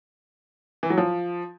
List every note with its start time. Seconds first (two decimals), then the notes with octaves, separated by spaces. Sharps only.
0.83 E3
0.90 F#3
0.98 F3